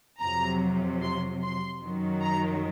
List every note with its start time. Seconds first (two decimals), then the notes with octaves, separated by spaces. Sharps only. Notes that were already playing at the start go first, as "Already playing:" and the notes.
0.21 F2 C3 F#3 A#5
1.02 C6
1.42 C6
1.82 F#2 D#3 F#3
2.22 A#5